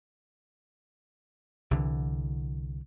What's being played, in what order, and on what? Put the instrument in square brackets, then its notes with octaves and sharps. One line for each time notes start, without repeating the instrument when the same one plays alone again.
[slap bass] C2 D3 E3